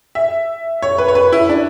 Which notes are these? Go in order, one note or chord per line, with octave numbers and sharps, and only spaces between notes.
E5
C#5
B4
C#5
B4
E4
D4